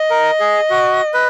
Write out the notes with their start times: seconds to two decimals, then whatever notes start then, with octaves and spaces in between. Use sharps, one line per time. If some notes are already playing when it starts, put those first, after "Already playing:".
Already playing: D#5
0.10 A#4
0.40 G#4
0.70 F#4
1.14 B4